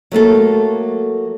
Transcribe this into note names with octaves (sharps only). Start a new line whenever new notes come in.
F#3 A3 A#3 A4